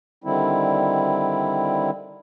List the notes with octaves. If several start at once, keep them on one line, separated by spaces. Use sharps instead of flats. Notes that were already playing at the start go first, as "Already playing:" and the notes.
D3 D#3 G3 C4 E4